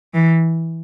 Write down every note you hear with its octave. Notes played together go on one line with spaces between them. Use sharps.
E3